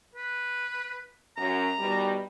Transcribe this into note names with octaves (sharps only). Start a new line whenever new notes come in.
B4
F#2 A#5
B2 D#3 G3